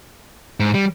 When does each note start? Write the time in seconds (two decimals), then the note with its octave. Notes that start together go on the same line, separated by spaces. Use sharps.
0.60 G#2
0.75 G3